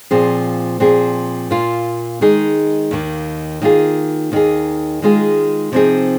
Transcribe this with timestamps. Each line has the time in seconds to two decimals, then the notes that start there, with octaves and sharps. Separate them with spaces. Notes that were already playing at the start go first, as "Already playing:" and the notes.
0.11 A#2 F3 C4 G#4
0.80 A#2 F3 C4 G#4
1.51 A#2 A#3 F4
2.21 D#3 G#3 D#4 G#4
2.91 D#2 D#3 A#3
3.62 D#3 A#3 F4 G#4
4.32 D#2 D#3 A#3 G#4
5.02 D#3 G#3 F4 G#4
5.72 C3 F3 C4 D#4 G#4